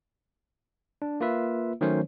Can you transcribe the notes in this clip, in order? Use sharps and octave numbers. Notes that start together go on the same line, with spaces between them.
D4
A#3 F4 B4 E5
D#3 F#3 A3 C#4 C5 C#5